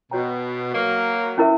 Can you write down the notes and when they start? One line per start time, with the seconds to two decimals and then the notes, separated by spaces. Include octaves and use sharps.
0.11 B2 F#4 C#5 G5 A#5
0.74 F#3 A#3
1.38 C#4 E4 A#4 E5